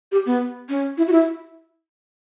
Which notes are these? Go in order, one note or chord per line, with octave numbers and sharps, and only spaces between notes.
G4
B3
C#4
E4
F#4
E4